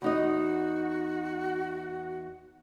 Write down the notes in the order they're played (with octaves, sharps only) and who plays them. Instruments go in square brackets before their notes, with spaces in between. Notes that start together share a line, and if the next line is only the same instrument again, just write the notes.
[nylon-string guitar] E2 D#4 D#5 [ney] F#4